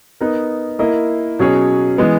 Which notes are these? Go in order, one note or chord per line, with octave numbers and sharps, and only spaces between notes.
B3 D#4 A#4
A#3 E4 A#4 D#5
B2 F#3 C#4 G#4 C#5
E3 G#3 B3